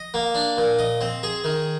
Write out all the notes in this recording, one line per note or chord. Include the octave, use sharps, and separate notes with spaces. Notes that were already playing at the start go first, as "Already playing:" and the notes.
Already playing: D#5
A#3
D4
A#2
D#5
C4
G#4
D#3